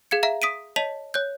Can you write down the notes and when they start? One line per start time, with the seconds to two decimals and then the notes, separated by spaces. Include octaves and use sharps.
0.11 G#4 F5 G#6 C#7
0.23 E5 F5 A#5
0.42 D#6 B6 D7 D#7
0.76 C#5 D#5 A5 B6 F7 F#7
1.14 C#5 F#6 G6